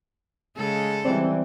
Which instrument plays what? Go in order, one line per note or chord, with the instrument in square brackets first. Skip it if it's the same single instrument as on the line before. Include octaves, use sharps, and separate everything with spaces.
[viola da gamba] C#3 G#3 A4
[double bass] E3 G3 [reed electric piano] C4 C5 D5